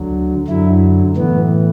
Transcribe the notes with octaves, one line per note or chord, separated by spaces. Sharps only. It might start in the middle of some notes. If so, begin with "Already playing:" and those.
Already playing: D2 D3 F#3
F#2 D3 F#3 E4
A2 E3 B3